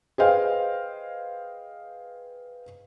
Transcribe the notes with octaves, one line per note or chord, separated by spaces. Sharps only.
G#4 B4 C5 D#5 F5 G5